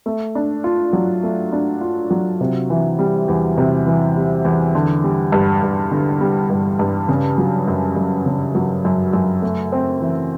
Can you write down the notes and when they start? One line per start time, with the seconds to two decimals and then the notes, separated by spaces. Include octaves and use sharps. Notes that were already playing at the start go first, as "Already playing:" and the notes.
0.06 A3
0.35 D4
0.64 F4
0.93 F#3
1.23 A3
1.52 D4
1.81 F4
2.11 F#3
2.41 C3
2.70 E3
2.99 G3
3.28 E2
3.58 C3
3.87 E3
4.16 G3
4.45 E2
4.75 D3
5.04 G3
5.32 G2
5.62 G2
5.91 D3
6.21 G3
6.50 G2
6.79 G2
7.09 C#3
7.38 F#3
7.68 F#2
7.97 F#2
8.26 C#3
8.55 F#3
8.85 F#2
9.13 F#2
9.42 A3
9.72 C4
10.01 E3